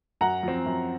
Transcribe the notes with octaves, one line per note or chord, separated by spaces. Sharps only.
F#2 F#5 A#5
F3 C4
F#2